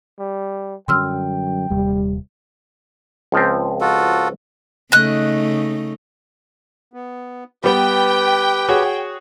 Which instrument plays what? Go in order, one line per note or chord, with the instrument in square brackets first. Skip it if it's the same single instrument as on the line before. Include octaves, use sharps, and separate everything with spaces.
[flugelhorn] G3
[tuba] F#2 [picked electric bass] D3 F#3 G3 [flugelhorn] G5 [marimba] C6 E6 F6
[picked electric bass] D#1 D#2 C3 [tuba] G3
[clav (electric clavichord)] C#2 F3 C4
[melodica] F4 F#4 A4
[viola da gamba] C#3 A3 D#4 [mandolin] D#5 F#6
[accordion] B3
[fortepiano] G3 B3 [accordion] G4 B4 [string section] G5
[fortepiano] F#4 G#4 C#5